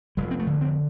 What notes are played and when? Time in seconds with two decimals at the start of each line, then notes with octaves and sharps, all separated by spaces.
0.17 F1 G3
0.31 C4
0.39 A3
0.47 D3
0.61 C4